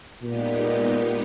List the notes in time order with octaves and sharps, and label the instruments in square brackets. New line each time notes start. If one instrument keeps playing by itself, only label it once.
[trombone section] A#2 [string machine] G#3 B3 D#4 G4